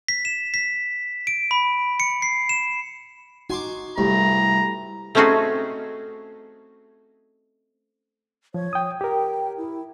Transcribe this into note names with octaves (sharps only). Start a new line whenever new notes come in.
B6
E7
B6
D7
B5
C#7
C7
E7
D#4 F#4 G#5 C6 D6
C2 G2 A3 E4 A#5
A3 C4 C#4 D#4 F#4 G#4
F3 C#5
G5 D#6
G4 A#4 G5
E4